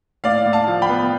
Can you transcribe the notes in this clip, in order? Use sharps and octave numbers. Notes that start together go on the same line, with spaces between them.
A2 D5 F5
A2
F5 A5
F3
G5 B5
B3